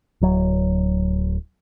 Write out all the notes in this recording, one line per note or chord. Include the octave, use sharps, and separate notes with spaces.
D1 F#3